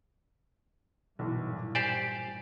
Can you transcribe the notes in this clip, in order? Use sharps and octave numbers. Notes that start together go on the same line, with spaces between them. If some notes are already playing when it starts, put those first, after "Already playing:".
B1 G2 A#2 E3
G4 C5 D5 G#5